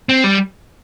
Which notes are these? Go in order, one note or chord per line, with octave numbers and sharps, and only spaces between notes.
C4
G3